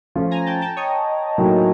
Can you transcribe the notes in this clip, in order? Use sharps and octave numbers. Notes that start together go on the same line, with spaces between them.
F3 A3 C#4 F4
G#5 A#5
G5 A5
G5 A5
C#5 D#5
A2 F#3 A#3 D#4 F#4